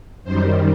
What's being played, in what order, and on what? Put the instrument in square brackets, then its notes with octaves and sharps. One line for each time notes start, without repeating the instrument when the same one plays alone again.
[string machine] F#2 D#3 G3 C5